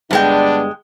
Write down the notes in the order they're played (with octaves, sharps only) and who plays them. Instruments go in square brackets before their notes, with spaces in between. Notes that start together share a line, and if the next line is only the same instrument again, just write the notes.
[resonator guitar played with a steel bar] G2 G#3 G5 [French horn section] D3 B3 D4